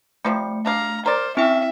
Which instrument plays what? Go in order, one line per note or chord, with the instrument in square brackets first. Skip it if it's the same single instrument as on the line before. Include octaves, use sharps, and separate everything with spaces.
[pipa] C3 F3 G3 [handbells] A3 C#7
[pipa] D4 F5 [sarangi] A#5
[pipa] A#4 D5 [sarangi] C5
[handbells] C4 E4 G5 [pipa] C#4 [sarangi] E5